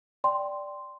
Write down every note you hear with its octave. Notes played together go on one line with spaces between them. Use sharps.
D5 G5 C6